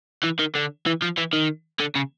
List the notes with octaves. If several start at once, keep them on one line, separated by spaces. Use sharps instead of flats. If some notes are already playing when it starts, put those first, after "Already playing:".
E3
D#3
D3
E3
F3
E3
D#3
D3
C#3